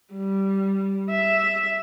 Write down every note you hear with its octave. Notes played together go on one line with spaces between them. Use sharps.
G3
E5